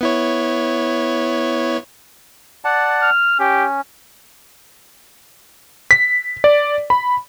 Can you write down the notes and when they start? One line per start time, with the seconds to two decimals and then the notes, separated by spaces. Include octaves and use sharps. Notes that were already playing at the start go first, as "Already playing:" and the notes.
0.01 B3 E4 C#5
2.65 D5 F#5 A5
3.02 F6
3.39 C#4 G4
5.91 B6
6.44 D5
6.90 B5